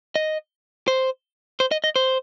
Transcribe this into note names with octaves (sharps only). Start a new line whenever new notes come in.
D#5
C5
C5
D#5
D#5
C5